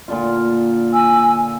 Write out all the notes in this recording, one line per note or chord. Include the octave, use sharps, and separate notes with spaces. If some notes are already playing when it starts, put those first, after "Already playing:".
A#2 D3 F4
G#5 E6